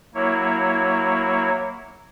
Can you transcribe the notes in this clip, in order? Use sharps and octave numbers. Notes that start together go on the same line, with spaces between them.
F#3 A#3 E4 C#5